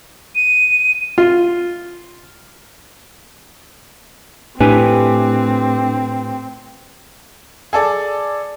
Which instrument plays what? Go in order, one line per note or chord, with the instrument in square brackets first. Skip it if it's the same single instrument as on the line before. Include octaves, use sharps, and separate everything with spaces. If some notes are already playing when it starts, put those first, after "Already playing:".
[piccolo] D#7
[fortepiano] F4
[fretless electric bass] A2 [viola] C4 [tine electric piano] D4 [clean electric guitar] G4 B4 G#5
[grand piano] G#4 A4 D5